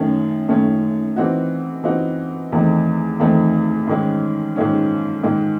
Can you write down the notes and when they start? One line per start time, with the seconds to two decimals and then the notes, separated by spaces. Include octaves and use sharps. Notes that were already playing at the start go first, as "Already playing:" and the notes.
Already playing: F#2 D#3 A3 C#4
0.48 F#2 D#3 A3 C#4
1.16 E3 C4 D#4 F#4
1.84 E3 C4 D#4 F#4
2.52 E2 D#3 A3 C4 D#4
3.20 E2 D#3 A3 C4 D#4
3.87 G#2 D#3 G#3 C#4
4.56 G#2 D#3 G#3 C#4
5.23 G#2 D#3 G#3